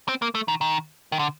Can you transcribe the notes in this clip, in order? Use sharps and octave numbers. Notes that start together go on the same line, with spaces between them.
C4
A#3
A3
D#3
D#3
D#3
D3